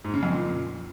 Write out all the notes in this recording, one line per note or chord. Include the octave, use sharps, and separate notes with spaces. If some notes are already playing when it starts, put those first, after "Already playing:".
G#2
C#3
F2
A#2